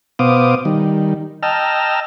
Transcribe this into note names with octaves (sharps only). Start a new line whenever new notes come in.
B2 B3 C5 F5 D6 D#6
D#3 G3
D#5 G5 A5 A#5 E6 F6